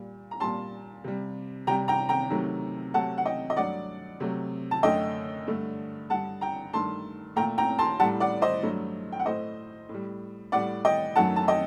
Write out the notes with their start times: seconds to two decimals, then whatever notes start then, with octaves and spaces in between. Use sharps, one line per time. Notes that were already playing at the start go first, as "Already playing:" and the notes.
Already playing: A#2 G3
0.31 A#5
0.40 A#2 G3 A5 C6
1.04 C3 G3
1.67 C3 G3 G5 A#5
1.88 G5 A#5
2.09 G5 A#5
2.30 C3 D#3 F#3 A3
2.94 C3 F#3 A3 F#5 A5
3.18 F#5
3.26 D#5 G5
3.50 D#5
3.57 G2 F#3 A3 D5 F#5
4.20 C3 F#3 A3
4.71 A5
4.83 F#2 D3 A3 D#5 G5
5.47 G2 D3 A3
6.10 G2 D3 G3 F#5 A5
6.41 G5 A#5
6.73 G2 D#3 A3 A5 C6
7.36 A#2 A3 G5 A#5
7.58 G5 A#5
7.79 A5 C6
8.00 G3 F#5 A5
8.03 A2
8.20 D5 F#5
8.42 C5 D#5
8.63 G2 F#3 A3
9.12 G5
9.19 F#5
9.26 A2 A3 C5 D#5
9.89 A2
9.94 G3
10.52 A2 G3 D5 F#5
10.85 D#5 G5
11.16 F#2 D#3 F#3 A3 F#5 A5
11.36 A5
11.48 D#5 G5